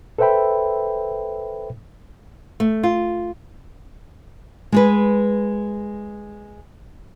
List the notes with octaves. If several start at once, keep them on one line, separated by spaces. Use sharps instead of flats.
A4 B4 C5 E5 G5 B5
A3
F4
G#3 G#4 B4